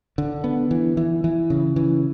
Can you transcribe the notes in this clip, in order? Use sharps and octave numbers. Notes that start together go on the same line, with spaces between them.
D3
B3
E3
E3
E3
C#3
E3